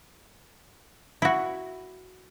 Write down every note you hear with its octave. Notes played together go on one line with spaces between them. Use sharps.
E4 F#4